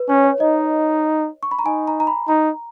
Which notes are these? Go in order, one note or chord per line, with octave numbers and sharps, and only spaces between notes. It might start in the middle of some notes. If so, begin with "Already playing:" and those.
Already playing: B4
C#4 C#5
C#5
D#4 D#5
C#6
B5
A#5
D#4 G#5
A#5
A#5
B5
D#4 A#5